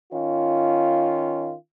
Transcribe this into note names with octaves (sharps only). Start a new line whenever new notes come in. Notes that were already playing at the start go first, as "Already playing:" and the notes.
D#3 C#4 F4